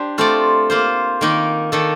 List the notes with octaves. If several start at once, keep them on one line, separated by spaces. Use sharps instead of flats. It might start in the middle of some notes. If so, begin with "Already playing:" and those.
Already playing: D4 G4 C5
A3 C4 F4 A4 D5
A#3 F4 C5
D#3 A#3 D#4
D#3 A#3 D#4 A4